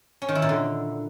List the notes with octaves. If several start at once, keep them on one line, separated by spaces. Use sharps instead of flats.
C#4
D#3
E4
A#2
D3